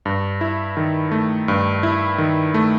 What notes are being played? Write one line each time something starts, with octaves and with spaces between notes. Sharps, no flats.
G2
E4
D#3
A3
G2
E4
D#3
A3